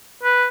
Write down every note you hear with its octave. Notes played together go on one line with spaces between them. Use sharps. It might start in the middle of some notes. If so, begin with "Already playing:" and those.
B4